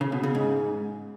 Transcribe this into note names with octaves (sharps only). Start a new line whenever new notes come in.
C#3
B2
C#3
G#2